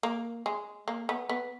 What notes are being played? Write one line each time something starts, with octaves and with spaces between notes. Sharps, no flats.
A#3
G#3
A#3
B3
B3